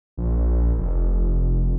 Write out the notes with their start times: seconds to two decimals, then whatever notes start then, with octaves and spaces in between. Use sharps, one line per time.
0.17 A#1
0.78 F1